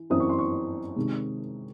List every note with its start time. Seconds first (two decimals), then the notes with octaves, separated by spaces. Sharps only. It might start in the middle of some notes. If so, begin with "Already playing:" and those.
Already playing: E3
0.10 F#2 E3 C4 E4 D#6
0.20 C#6
0.29 C6
0.39 C#6
0.96 C3 D#3 G#3